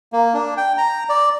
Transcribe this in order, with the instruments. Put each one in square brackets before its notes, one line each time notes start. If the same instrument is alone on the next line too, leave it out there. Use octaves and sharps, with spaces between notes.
[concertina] A#3
D4
G5
A#5
D5